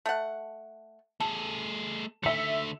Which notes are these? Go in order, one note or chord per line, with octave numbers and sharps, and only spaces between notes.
A3 F#5
A3 G#4 A4
D3 A3 E5 C#7